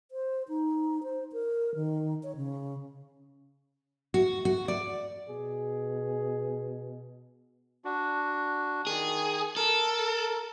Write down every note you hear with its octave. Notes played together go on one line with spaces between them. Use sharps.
C5
D#4
C5
A#4
D#3
C#5
C#3
F#4
F#4
D5
B2 G#4
D4 F#4
D#3 G#4
A4 A#4